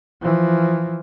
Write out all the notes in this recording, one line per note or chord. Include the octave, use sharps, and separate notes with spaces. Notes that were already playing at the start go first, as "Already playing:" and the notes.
E3 F3